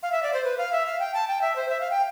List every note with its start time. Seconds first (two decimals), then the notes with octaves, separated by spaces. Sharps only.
0.03 F5
0.12 E5
0.23 D5
0.34 C5
0.44 B4
0.58 F5
0.72 E5
0.86 F5
0.99 G5
1.14 A5
1.28 G5
1.41 E5
1.56 C5
1.69 E5
1.80 F5
1.91 G5